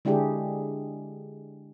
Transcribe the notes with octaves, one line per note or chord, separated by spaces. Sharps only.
D3 G#3 D4 E4 G4 G#4